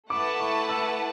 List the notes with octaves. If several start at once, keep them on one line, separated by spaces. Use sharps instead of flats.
A3 E4 B4 F#5 A5 D6
C#6
E6